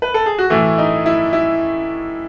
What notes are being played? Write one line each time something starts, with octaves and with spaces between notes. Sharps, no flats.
B4
A4
G#4
F#4
A2 E3 A3 E4
D#4
E4
E4